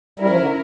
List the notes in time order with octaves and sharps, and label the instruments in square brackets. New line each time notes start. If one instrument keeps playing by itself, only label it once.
[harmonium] G3 [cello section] C#4 E4 A#4
[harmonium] F3
D3